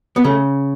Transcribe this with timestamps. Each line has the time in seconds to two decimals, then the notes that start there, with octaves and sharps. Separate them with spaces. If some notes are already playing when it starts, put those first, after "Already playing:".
0.16 B3
0.24 C#3 A3